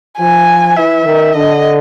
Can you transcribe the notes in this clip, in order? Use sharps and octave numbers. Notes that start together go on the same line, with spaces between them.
F3 G#5
E3 E5
D#3
D3 D#5